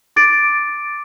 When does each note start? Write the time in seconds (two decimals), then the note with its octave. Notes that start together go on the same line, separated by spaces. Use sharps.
0.16 D6 A6 D7